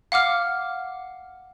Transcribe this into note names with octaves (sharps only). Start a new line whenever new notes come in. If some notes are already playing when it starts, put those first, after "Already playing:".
F5 F#5 D6 F6